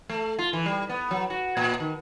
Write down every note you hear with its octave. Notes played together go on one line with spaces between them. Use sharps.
A3
F4
E3
G3
B3
F#3
F#4
A#2
D#3